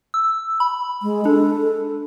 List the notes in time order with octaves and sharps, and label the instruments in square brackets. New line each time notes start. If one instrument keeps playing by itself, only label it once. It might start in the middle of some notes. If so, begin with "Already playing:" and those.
[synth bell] E6
B5
[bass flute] G#3
[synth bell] D4 [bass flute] A4